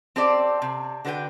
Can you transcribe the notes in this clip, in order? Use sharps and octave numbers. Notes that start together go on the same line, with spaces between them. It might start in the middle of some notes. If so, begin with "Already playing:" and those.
C4 G4 A4 C5 D5
C3
D3 F#4 B4 C5 G5